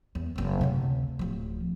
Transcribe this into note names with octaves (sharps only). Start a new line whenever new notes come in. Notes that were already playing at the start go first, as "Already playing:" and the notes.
E2
F#1 C4
D2 C3
D1 F3